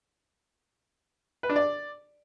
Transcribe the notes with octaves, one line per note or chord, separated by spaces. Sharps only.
B4
D4
D5